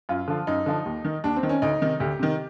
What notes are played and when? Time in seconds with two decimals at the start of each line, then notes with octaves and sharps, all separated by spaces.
0.09 F#2 F4
0.28 D3 F3
0.47 F#2 D#4
0.66 D3 F3
0.85 D#2
1.05 D#3
1.24 D#2 D4
1.36 C4
1.43 D#3
1.49 C#4
1.62 D2 D#4
1.81 C3 D#3
2.00 D2 G4
2.19 C3 D#3